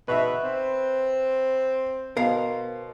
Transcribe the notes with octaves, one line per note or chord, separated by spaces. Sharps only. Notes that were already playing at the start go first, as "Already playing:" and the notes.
B2 B4 E5
C4
B2 A#4 C5 F5